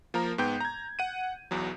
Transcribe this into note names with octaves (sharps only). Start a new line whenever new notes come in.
F3 A#3 A#4 A#5
G#2 B3 G5 G6
A#5 G#6
F#5 D#7
B1 E2 B2 F#3